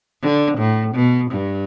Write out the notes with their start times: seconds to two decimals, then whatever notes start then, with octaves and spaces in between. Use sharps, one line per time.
0.23 D3
0.58 A2
0.95 B2
1.31 G2